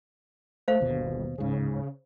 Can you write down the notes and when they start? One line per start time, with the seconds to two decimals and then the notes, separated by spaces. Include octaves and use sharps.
0.68 A3 C5 F5
0.81 G1 D#2 B2
1.38 D1 G#2 C#3